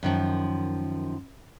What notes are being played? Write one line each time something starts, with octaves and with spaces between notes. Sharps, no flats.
F#2 D#3 F3